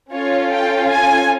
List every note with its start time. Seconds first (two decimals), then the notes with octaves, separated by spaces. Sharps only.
0.12 C#4 F4 A4 C#5
0.51 G5
0.90 G#5